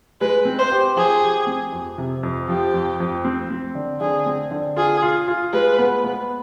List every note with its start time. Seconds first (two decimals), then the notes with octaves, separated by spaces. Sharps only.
0.21 G#3 B4
0.45 C4
0.59 C5
0.72 G4
0.96 F3 G#4
1.21 G4
1.47 C4
1.72 F2
1.98 C3
2.23 F2
2.48 F3 G4
2.74 F2
3.00 F2
3.25 C4
3.50 C4
3.75 D3
4.00 D3 G#4
4.26 C4
4.51 D3
4.76 F4 G#4
5.02 F4
5.28 F4
5.53 G#3 B4
5.78 B3
6.04 B3